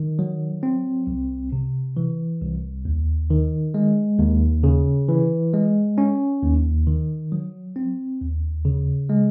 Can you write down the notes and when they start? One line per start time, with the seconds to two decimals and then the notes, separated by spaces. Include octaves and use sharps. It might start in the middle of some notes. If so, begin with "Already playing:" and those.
Already playing: D#3
0.19 F#3
0.63 C4
1.07 C2
1.52 C3
1.97 E3
2.41 C2
2.85 D#2
3.30 D#3
3.74 G#3
4.19 D#2
4.63 C#3
5.09 E3
5.54 G#3
5.98 C#4
6.43 D#2
6.87 D#3
7.32 F#3
7.76 C4
8.21 D#2
8.65 C#3
9.09 G#3